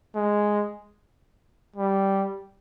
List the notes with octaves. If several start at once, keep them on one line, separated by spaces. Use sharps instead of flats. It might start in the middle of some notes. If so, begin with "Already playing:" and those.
G#3
G3